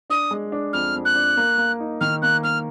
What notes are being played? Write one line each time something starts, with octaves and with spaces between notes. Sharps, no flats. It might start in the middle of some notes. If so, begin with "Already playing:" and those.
D4 D#6
G#3
D4
F2 F6
F2
F#6
D4
A#3
A#3
D#4
D#3 F6
A#3 F#6
A#3 F6